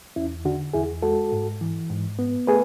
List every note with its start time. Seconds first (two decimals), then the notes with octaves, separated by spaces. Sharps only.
0.16 E2 C#4 E4
0.45 D3 D4 F#4
0.73 E2 E4 G#4
1.02 G#3 F#4 A4
1.32 G#2
1.61 E3
1.90 G#2
2.19 B3
2.47 A3 G#4 B4